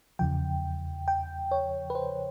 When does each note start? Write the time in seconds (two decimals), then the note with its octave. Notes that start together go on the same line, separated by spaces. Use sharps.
0.19 E2 C#3 F3 G5
1.08 G5
1.51 C#5
1.90 B4
1.95 C5